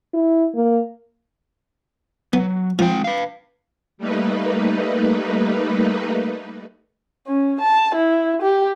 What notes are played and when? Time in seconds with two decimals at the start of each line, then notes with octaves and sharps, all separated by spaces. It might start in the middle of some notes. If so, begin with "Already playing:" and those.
0.14 E4
0.55 A#3
2.33 F#3 B3
2.79 F3 G#3 C4 G5
3.04 B4 F5
3.98 G3 A3 A#3 D#4 B4
7.27 C#4
7.61 A5
7.95 E4
8.42 G4